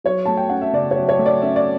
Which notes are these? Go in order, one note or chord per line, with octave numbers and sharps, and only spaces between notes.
F#3 C#5
A3 A5
G5
C#4 F#5
E5
C#3 D5
C#5
F#3
C#5
A3
D5
C#4 E5
D5